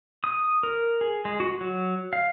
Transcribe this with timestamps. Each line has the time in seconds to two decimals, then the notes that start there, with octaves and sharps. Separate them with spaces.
0.24 D#6
0.63 A#4
1.01 G#4
1.25 G#3
1.40 F#4
1.61 F#3
2.13 F5